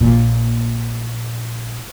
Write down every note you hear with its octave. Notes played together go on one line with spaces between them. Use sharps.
A#1 A#2